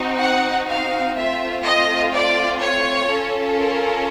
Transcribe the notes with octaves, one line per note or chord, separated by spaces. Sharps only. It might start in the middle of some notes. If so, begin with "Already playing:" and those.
Already playing: C4 D#4 F#4
F#5
F5
A3 C4 F4 E5
D#5
D5
C#5
C#4 F4 A4
A#4